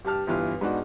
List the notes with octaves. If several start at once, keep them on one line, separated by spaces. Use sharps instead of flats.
G2 G4 A5 F6
G1 G2 E3 F4 F6
G#2 B3 D4 D#4 F#4